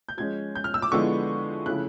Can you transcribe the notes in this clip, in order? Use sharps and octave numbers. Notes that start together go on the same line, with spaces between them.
G6
F3 G#3 C#4 G#6
G6
F6
E6
D6
D3 F3 G#3 B3 E4 C#6
C#3 F3 A3 C#4 E4 F#6